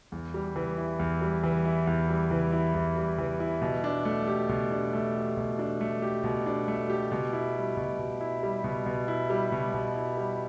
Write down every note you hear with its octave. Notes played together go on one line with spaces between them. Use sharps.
E2
G3
E3
E4
E2
G3
E3
E4
E2
G3
E3
E4
E2
G3
E3
E4
B2
D4
A3
G4
B2
D4
A3
G4
B2
D4
A3
G4
B2
D4
A3
G4
B2
E4
G3
B2
B2
E4
G3
B2
B2
E4
G3
B2
B2
E4
G3